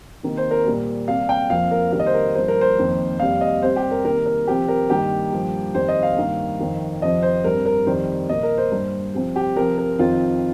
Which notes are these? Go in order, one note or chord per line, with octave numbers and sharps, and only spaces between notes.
C3 D#3 A#3
C5
A#4
A#2 G3 A#3
C3 G3 A#3 F5
G5
F2 F3 A#3 F5
A#4
C3 D#3 G3 A#3 F5
D#5
C5
A#4
G2 F3 A#3 C5
A#4
C5
F2 D#3 A#3
F2 C3 G3 A#3 F5
D#5
C3 G3 C4 C5
G4
A#4
C3 D#3 A#3 A#4
A#4
C3 F3 C4 G4
A#4
G2 D#3 A#3 G4
G2 F3 A#3
F2 D#3 G3 C4 C5
D#5
F5
G2 D#3 A#3
F2 D#3 C4
F2 C3 F3 C4 D#5
C5
G2 G3 C4 A#4
A#4
F2 D#3 G3 C5
A#2 A#3 D#5
A#4
C5
G2 G3 A#3
C3 F3 C4
G4
C3 F3 C4 A#4
A#4
F2 D#3 C4 F4